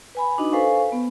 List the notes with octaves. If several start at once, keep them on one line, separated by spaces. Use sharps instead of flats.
B4 G#5 B5
D4 D#4 F#4 D#5
A4 B4 C5 F5 G#5 C#6
B3